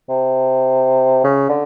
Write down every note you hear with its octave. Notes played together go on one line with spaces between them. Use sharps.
C3
C#3
D3